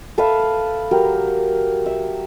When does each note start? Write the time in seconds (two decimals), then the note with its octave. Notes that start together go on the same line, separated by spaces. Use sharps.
0.18 A4 B4 E5 F5
0.91 F#3 G4 A#4
1.86 E5